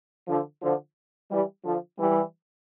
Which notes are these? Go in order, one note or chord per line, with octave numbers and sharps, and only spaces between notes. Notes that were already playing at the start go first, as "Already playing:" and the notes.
D3 F3
D3 F3
E3 G3
D3 F3
E3 G3